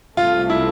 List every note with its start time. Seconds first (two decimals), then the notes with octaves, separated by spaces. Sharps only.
0.17 C2 C3 F3 A3 F4
0.50 E4